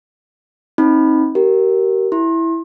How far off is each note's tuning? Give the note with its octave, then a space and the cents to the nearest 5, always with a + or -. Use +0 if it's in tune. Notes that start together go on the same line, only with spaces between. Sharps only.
C4 +35 D#4 +25 B5 +0
G4 -30 A#4 +0
E4 +0 C6 +35